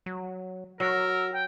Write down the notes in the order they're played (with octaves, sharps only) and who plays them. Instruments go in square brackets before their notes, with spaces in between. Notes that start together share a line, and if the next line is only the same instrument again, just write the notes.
[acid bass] F#3
[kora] F#3 [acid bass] F#4 [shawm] A#4 [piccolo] E6
[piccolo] G5